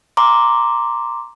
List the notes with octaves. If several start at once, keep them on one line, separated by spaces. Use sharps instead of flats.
A#5 C6 D6